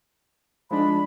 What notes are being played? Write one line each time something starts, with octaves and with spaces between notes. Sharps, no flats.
F3 G#3 D4 B5